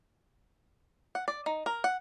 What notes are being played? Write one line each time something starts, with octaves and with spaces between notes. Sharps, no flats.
F#5
D5
D#4
A#4
F#5